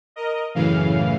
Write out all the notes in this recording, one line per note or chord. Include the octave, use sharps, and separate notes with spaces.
A#4 D#5
F#2 A2 C#3 E3 F5